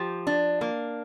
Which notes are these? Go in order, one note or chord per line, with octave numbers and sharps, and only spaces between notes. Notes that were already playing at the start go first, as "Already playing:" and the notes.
Already playing: F3 G4
D4
A#3